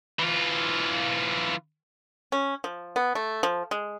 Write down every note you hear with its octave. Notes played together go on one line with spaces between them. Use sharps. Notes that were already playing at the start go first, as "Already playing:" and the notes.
E3 F4
C#4
F3
B3
A3
F3
G#3